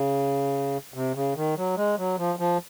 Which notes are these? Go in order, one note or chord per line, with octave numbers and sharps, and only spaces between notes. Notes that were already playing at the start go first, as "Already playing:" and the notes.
Already playing: C#3
C3
C#3
D#3
F#3
G#3
F#3
F3
F3